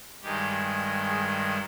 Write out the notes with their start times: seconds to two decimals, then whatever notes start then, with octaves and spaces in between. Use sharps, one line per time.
0.23 G2 D#3 G#3 G4
1.07 G#4